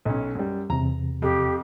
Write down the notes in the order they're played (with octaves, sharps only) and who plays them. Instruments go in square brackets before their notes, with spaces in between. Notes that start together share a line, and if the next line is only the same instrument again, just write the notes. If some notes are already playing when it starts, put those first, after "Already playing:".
[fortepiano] B1 C#4
F#2 G3
[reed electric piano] E2 C3 [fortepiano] A#5
[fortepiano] F2 [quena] G4